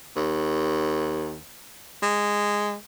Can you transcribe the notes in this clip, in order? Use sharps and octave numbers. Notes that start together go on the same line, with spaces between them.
D#2
G#3